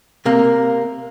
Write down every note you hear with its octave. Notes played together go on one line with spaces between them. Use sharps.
C3 A#3